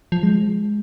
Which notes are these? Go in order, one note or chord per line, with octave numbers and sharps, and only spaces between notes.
F3
G#3